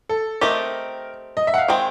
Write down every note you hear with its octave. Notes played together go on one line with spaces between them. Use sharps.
A4
A3 C4 D#4 G4 A#4
D#5
E5
F#5
F5
D#3 G#3 C4 G5